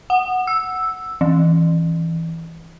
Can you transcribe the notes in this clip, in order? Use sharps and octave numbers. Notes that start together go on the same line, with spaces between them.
F#5
E6
E3